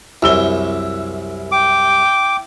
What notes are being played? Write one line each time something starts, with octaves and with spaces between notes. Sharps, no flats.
C2 F#2 E4 E6 G7
G5 D6